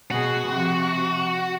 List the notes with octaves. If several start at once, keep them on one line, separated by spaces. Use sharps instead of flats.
B2 F#4 G#4
C3 F3